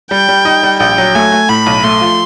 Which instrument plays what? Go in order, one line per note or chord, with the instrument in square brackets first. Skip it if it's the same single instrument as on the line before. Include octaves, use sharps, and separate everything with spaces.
[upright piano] G3 [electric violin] G5
[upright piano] G3
D#4
G3
[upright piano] A#1 [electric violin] G5
[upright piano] F#3
[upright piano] A3 [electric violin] G#5
[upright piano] A3
[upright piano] A2 [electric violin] B5
[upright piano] B1
[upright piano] A3 [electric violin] C6
[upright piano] F3